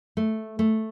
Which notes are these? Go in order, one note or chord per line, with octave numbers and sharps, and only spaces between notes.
A3
A3